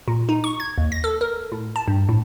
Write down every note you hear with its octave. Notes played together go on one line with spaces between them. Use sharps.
A#2
D#4
C#6
G#6
D#2
A#6
A4
A#4
A2
A5
G2
A2